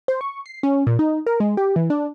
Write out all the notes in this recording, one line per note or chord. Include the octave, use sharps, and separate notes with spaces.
C5
C#6
C7
C#4
A#2
D#4
A#4
G#3
G4
E3
D4